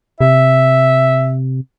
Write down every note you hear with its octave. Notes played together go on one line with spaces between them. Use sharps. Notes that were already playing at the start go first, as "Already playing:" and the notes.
C3 E5